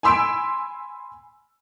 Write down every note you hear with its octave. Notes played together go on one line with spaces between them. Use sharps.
G#5 B5 C6 E6 B6 D7